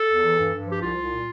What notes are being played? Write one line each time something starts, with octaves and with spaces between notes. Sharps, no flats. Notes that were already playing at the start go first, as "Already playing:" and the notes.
Already playing: A4
E2
E3
G2
G2
F3 G4
C2 F4
C2
A#2